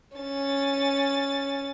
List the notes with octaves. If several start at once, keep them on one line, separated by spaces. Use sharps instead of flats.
C#4 A6